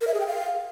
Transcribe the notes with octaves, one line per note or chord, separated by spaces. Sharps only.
A#4
E5
G#4
G5
F5